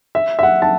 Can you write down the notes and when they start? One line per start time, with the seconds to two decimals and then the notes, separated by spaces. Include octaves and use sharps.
0.15 E5
0.39 E5
0.43 F#5
0.62 A5